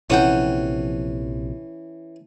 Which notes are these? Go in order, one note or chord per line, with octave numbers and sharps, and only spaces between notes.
A#1 C3 E3 F3 C#4 A4 F#5 G5